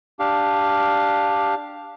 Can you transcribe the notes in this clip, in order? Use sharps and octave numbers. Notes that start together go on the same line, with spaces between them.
D4 G4 F5